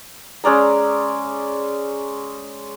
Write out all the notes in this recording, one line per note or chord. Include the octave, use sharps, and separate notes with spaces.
G#3 C#4 D5 A#5